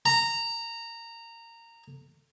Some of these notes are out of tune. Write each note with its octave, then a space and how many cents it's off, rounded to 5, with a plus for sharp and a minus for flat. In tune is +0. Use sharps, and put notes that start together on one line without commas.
A#5 -15